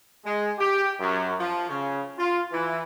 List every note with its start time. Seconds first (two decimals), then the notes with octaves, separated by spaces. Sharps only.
0.24 G#3
0.59 G4
1.00 F#2
1.39 F3
1.69 C#3
2.18 F4
2.52 E3